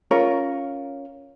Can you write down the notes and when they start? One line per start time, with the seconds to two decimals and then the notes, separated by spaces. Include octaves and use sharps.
0.11 C#4 F4 A#4 C#5